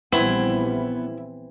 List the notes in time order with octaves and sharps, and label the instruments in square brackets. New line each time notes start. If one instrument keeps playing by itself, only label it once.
[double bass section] A#1 F3 G3 [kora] E3 C4 [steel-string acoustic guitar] B3 [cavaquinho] E4